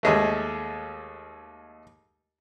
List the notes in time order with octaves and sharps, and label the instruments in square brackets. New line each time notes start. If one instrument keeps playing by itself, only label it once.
[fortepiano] D#2 G#3 A3